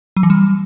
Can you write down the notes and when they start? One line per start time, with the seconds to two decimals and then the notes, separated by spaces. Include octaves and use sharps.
0.16 F#3
0.23 E3
0.30 G3